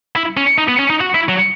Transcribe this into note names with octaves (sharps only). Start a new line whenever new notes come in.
E4
C#4
D#4
B3
C#4
D#4
F#4
E4
F#3